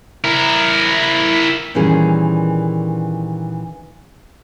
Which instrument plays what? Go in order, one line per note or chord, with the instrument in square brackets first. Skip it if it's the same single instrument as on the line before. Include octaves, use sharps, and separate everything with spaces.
[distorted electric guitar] E4 A#4
[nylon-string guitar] A#2 D#3 E3 G3 C#4 G#4